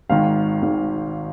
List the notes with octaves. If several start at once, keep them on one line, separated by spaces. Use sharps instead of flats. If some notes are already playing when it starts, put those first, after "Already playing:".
G#1 G#2 D#3 F5
G#1 G#2 D#3